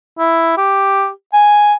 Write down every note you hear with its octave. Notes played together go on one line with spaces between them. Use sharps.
E4
G4
G#5